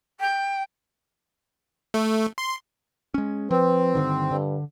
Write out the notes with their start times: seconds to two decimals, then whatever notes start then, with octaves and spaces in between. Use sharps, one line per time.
0.20 G5
1.94 A3
2.38 C6
3.14 G#3 C#4
3.51 F3 C4 B4
3.95 G2 D3 D#3
4.31 G2 D3